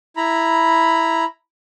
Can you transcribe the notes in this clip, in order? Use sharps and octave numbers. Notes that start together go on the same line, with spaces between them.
E4 A#5 B5